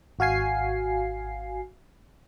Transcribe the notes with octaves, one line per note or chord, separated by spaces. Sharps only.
G#1 F#4 F5 G#5 C7